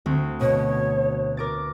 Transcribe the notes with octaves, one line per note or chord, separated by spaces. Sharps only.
D2 C4
B2 C#5
A#4 D6 A6